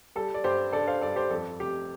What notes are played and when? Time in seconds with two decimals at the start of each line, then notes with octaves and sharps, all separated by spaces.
0.16 G3 A4
0.34 D5
0.44 G2 G4 C5
0.73 D4 A4 D5
0.87 C5 F5
1.01 G2 A4 D5
1.16 G4 C5
1.31 F2 A4
1.60 F1 G4